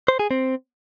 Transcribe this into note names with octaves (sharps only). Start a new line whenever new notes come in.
C5
G#4
C4